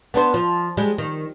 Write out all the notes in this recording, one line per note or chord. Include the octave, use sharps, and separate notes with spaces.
B3 D4 C5
F3
G3 G#3
D#3